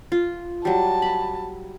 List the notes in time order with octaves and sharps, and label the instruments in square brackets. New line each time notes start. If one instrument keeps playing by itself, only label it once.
[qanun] F4
[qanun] F#3 G3 [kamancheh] A5
[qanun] B5